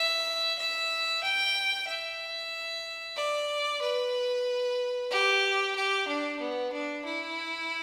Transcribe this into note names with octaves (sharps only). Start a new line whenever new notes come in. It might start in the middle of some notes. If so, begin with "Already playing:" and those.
Already playing: E5
E5
G5
E5
D5
B4
G4
G4
D4
B3
D4
E4